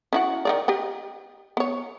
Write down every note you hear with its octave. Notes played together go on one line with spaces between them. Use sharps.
C#4 E4 F#4
D#3 A#3 D5
G4 D#5 G5
B3 C#5